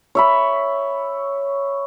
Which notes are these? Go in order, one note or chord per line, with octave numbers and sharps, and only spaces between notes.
C#5 E5 B5